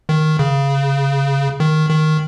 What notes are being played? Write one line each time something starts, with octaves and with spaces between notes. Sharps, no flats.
D#3
C#3
D#3
D#3